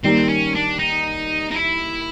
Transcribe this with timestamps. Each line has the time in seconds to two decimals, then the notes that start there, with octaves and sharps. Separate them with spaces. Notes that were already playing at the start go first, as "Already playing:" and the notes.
0.04 D#3 G3 A#3 C4
0.29 C#4
0.55 D4
0.79 D#4
1.51 D#4
1.55 E4